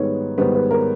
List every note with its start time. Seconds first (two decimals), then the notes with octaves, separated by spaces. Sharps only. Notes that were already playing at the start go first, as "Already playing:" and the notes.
Already playing: G#2 D#3 G3 B3 C#5
0.38 G#2 D#3 G3 B3 C5
0.54 B4
0.71 A#4